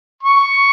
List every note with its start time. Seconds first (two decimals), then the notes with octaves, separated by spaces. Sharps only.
0.23 C#6